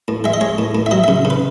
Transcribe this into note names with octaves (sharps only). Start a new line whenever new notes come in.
A2
G#3 E5
D#5
G#3 C#5
A2
A2
E5
F#3 D#5
C#3 E5
C#3
B4